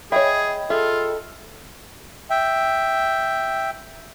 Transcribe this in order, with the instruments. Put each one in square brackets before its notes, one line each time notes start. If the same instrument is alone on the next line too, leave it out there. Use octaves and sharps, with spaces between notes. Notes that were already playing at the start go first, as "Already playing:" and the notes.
[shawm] G#4 [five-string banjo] C#5 E5 [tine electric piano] D#5 G5 B5
[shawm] F4 [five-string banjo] G#4 E5 [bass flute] A4
[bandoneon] E5 G5